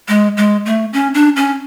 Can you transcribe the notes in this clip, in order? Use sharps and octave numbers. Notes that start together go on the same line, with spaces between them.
G#3
G#3
A3
C#4
D4
C#4